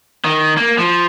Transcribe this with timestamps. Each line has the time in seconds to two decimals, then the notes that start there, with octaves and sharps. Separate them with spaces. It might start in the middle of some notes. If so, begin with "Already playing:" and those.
0.25 D#3
0.57 A#3
0.78 F3